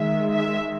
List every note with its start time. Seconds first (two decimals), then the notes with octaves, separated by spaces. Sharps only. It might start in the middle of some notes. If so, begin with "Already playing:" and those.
Already playing: D#3 G#3 E5
0.32 E5